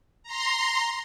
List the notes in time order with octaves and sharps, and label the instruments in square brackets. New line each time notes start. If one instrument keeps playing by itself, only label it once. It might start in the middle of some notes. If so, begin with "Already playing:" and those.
[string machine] A#5 C6